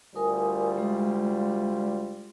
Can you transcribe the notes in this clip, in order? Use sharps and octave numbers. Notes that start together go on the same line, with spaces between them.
D2 G3 F4 A#4 G#5 D#6
G#3